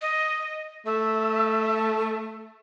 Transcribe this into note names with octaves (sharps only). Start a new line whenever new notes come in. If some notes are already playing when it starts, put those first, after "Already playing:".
D#5
A3 E5